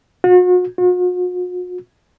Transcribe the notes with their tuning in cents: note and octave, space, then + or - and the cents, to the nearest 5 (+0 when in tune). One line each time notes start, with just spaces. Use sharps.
F#4 -40
F#4 -45